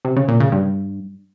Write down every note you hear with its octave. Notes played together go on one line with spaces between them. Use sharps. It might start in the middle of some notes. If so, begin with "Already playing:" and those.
C3
C#3
A#2
C#3
G2